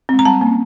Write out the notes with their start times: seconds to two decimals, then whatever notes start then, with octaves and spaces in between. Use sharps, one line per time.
0.09 G#3 C4
0.19 A#5
0.25 G3 A5
0.41 A#3 C#4